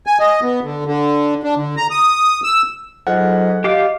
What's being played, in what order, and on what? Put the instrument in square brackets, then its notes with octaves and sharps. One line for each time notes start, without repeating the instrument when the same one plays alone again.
[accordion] G#5
D#5
B3
D3
D3
D4
D3
A#5
D#6
E6
[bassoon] G#2 [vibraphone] F#3 F4 A4 [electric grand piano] F#5
[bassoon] F4 [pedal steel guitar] G4 F5 D6 [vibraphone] D#5